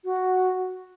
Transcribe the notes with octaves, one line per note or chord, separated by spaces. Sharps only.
F#4